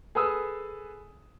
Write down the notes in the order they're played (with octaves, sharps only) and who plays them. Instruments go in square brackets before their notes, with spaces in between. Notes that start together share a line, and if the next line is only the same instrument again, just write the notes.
[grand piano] G#4 A4 B4 G#5 D#6 E6